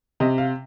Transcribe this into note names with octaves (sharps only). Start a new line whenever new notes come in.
C3 D#5
F5